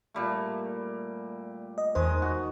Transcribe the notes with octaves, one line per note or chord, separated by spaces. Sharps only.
A#2 G3 A3
D#5
E2 D#3 G#3 C5 D#5
F#4